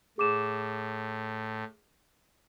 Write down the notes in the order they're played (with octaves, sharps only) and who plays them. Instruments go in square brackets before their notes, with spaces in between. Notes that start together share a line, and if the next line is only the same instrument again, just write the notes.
[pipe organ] A2 [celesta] G#4 D6 E7